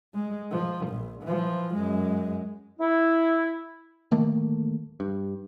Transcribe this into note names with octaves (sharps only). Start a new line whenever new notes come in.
G#3
F3
A#1
E3 F3
F#2 G#3
E4
D1 D#3 A3 A#3
G2